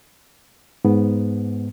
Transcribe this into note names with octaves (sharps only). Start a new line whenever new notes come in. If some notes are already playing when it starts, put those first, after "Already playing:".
G#2 B3